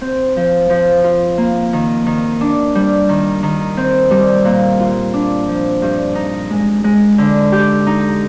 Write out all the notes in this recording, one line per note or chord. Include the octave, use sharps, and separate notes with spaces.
C4
F3
F3
F4
A#3
D#3
D#3
D4
G3
D#3
D#3
C4
G3
A#2
F4
D4
F3
G2
D#4
G#3
G#3
D3
G4
D#4